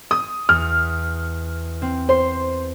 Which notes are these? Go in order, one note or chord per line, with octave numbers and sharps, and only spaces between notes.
D#6
E2 F6
C4
C5 C6